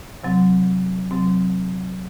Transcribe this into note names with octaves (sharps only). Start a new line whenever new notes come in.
C3 F#3 C4
C3 F#3 C4